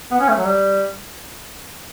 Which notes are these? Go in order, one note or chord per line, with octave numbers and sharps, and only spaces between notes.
B3
C#4
A3
F#3
G3